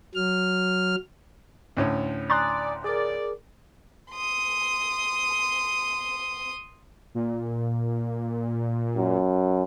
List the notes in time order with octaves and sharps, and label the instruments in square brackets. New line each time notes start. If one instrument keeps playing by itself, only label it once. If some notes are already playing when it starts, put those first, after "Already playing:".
[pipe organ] F#3 F6
[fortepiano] D2 A2 C#4
[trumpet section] D5 [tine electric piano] G#5 D#6 A6 [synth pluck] A#5 C6 F#6
[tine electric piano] G#4 A#4 [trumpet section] D5
[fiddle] C6 D#6
[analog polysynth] A#2
[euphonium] F#2